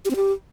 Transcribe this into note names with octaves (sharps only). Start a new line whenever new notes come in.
G4
C4
G4